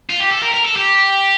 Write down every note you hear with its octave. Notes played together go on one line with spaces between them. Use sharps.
F4
G4
A4
A#4
A#4
A4
G4